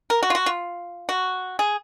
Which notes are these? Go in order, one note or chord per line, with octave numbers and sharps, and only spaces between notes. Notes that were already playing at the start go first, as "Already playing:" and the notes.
A#4
F#4
F4
F#4
F4
F#4
G#4